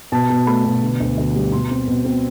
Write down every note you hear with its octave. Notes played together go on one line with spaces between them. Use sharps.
B2 A5
B2
A3 B5
B2
D3
D2
D2
G3
B2 C6
C4
B2
C4